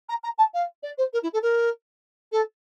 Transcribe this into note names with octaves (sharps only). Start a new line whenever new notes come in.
A#5
A#5
A5
F5
D5
C5
A#4
E4
A4
A#4
A4